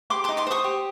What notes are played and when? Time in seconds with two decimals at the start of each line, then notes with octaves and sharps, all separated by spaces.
0.10 G4 C6 D6
0.24 C6 D6
0.29 D#4
0.37 C6 D6
0.47 C5 C#6 D#6
0.64 G4